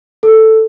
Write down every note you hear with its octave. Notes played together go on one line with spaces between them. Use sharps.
A4